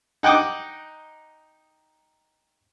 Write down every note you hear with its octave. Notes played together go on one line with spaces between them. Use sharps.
D#4 F#5 G5 D6 D#6